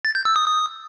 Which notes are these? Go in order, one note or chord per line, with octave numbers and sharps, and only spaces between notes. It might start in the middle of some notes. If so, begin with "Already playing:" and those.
A6
G6
E6
D#6
D#6